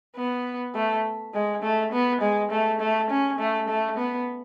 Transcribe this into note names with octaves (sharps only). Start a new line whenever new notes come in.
B3
A3
G#3
A3
B3
G#3
A3
A3
C#4
A3
A3
B3